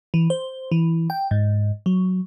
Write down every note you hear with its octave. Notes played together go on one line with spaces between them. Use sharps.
E3
C5
E3
G5
G#2
F#3